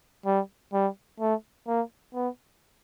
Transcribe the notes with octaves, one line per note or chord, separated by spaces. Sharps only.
G3
G3
A3
A#3
B3